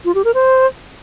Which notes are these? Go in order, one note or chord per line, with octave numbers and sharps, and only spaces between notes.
F4
G4
A#4
C5